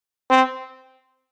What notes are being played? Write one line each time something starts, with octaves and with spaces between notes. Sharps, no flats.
C4